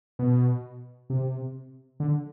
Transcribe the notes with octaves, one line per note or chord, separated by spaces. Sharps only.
B2
C3
D3